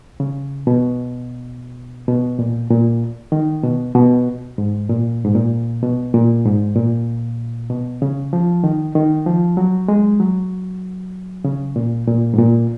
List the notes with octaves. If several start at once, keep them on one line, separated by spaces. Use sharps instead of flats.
C#3
B2
B2
A#2
A#2
D#3
B2
B2
G#2
A#2
G#2
A#2
B2
A#2
G#2
A#2
B2
C#3
F3
D#3
D#3
F3
F#3
G#3
F#3
C#3
A#2
A#2
G#2
A#2